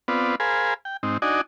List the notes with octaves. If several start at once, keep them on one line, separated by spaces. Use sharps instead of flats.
B3 C4 F4 B4 D5
G#4 A#4 C5 F5 G#5 B5
G5
G#2 C4 D#4
D4 D#4 F#4 D5 D#5 G#5